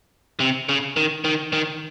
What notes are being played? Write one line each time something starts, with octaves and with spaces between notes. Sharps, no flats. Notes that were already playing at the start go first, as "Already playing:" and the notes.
C3
C#3
D#3
D#3
D#3